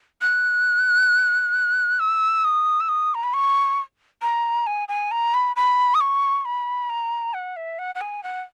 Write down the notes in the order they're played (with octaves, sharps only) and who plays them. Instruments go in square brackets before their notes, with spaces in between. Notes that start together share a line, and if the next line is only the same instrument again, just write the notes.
[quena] F#6
E6
D#6
E6
D#6
A#5
B5
C#6
A#5
G#5
G#5
A#5
B5
B5
D#6
C#6
B5
A#5
F#5
E5
F#5
F#5
G#5
F#5